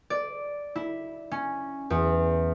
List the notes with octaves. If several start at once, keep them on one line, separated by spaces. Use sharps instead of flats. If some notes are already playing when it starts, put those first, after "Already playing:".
D5
E4
C#4
E2